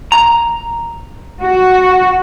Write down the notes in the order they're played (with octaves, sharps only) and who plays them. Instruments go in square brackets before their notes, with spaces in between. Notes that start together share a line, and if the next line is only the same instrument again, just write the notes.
[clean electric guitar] A#5
[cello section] F#4